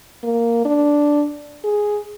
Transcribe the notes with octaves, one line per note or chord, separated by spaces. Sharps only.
A#3
D4
G#4